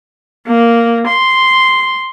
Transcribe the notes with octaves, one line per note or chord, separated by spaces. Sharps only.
A#3
C6